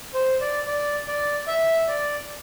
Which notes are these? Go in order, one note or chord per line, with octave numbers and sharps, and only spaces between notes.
C5
D5
D5
D5
E5
D5